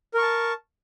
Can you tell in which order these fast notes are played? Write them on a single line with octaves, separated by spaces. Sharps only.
A#4 C#6 A5